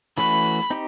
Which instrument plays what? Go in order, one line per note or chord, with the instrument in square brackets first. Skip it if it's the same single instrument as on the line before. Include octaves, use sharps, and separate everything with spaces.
[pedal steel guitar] E3 A3 C#4 F#4 B4 [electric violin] B5
[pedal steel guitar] C4 D#4 G4